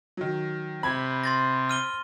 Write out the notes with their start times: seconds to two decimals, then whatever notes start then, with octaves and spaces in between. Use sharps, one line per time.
0.17 D#3 F#3
0.83 C3 B5 G#6
1.24 C6 A6 A#6
1.69 F6 D#7 G7